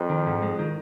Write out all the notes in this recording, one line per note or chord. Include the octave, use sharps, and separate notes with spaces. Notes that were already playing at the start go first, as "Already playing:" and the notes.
Already playing: F2
D#3
G#2
G#3
D#3